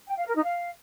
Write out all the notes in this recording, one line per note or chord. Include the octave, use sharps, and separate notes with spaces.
G5
F5
A#4
D#4
F5